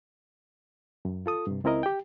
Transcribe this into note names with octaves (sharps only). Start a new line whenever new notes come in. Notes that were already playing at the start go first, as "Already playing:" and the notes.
F#2
F4 A4 D#6
G2 C3
C#2 C4 E4 A#4 D#5
G4 G5